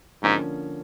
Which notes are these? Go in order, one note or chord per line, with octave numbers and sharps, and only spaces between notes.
G#2 D3 F3 A#3 C#4